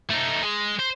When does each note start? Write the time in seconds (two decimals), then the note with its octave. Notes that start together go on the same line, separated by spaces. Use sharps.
0.10 A3 D#4
0.43 G#3 G#4
0.79 C5